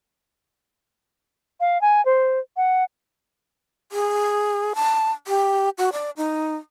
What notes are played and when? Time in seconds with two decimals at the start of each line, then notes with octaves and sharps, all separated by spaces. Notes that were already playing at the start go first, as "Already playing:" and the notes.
1.60 F5
1.81 G#5
2.05 C5
2.57 F#5
3.92 G#4
4.75 A5
5.27 G4
5.78 F#4
5.92 D5
6.17 D#4